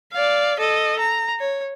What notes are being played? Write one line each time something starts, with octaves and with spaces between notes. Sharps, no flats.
D5 F5
A4 D#5
A#5
C#5